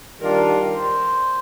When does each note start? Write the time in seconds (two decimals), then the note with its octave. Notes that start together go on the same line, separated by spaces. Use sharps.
0.21 D#3 G3 D4 F4 A#4
0.74 C5